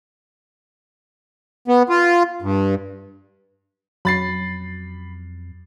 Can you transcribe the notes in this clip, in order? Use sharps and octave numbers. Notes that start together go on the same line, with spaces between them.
B3
F4
G2
F2 F#3 B5 A6 C7